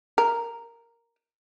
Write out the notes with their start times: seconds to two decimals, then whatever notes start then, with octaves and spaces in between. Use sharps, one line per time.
0.18 A#4